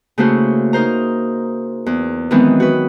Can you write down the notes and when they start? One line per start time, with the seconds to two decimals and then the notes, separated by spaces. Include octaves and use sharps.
0.18 C#3 A3 A#3 E4 F#4 C5
0.73 D#4 A#4 C5 A#5
1.86 E2
2.31 D#3 E3 F#3 G#3 B3 C4
2.60 F#4 B4